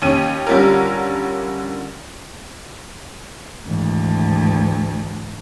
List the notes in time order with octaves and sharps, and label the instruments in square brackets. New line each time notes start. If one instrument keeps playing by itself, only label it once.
[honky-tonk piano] D#2 C#4 D#7
D3 G3 C#4 F4 A#4
[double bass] G#1 E3 [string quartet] D2